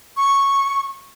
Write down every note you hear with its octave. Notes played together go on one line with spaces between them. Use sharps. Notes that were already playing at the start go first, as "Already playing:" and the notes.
C#6